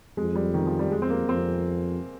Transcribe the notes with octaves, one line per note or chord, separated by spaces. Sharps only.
F2 G#3
G3
D#3
F3
G3
F2 G#3
C4
A#3
F2 C4